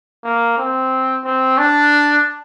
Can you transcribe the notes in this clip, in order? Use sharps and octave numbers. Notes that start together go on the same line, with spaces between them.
A#3
C4
C4
D4